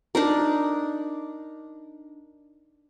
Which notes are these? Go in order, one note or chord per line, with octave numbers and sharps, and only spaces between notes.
D4 D#4 A#4